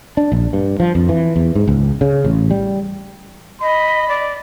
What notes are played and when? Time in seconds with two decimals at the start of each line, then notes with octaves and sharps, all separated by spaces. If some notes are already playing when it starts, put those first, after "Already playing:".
0.17 D4
0.32 A#1
0.53 G2
0.80 F3
0.95 F2
1.09 E3
1.36 E2
1.55 G#2
1.68 C#2
2.01 C#3
2.24 A1
2.51 G3
3.62 D#5 B5
4.08 D5